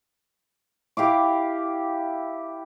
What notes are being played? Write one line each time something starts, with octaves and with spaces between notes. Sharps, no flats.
E4 G4 F5 D6